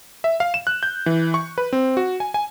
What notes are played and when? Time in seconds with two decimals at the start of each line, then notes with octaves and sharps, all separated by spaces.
0.24 E5
0.40 F5
0.54 E7
0.67 F#6
0.83 G6
1.06 E3
1.34 C#6
1.58 B4
1.73 C4
1.97 F#4
2.20 G#5
2.34 G#5